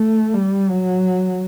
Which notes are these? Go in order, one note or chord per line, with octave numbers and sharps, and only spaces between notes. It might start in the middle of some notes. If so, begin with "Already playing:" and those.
Already playing: A3
G3
F#3